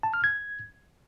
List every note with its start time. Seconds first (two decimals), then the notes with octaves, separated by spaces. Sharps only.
0.03 A5
0.14 F6
0.24 G#6